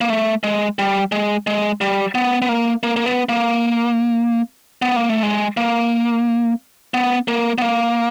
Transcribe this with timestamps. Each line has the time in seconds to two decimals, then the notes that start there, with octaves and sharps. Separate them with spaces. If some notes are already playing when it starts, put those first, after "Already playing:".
0.01 A#3
0.10 A3
0.43 G#3
0.79 G3
1.12 G#3
1.47 G#3
1.81 G3
2.15 B3
2.42 B3
2.49 A#3
2.83 A#3
2.96 A#3
3.06 B3
3.29 A#3
4.82 B3
4.96 A#3
5.09 A3
5.23 G#3
5.57 A#3
6.94 B3
7.28 A#3
7.58 B3
7.62 A#3